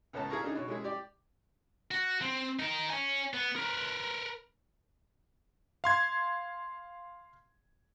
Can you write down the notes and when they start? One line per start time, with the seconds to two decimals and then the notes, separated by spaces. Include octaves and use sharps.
0.13 C#2 A2 B3 C#4 A#4 A5
0.30 E4 G#4 A#4 F5 A#5 C#6
0.42 C#3 D4 D#4 G#4
0.55 B2 C#5
0.68 G#3 C#4 E4 G#4
0.84 G4 D5
1.91 F#4
2.22 C4
2.59 D#4 A#4
2.90 C#5 G#5
3.34 B3
3.56 A#4 B4
5.84 F5 C6 G#6